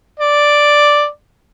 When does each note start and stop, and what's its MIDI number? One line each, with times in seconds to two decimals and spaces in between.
0.20 1.07 74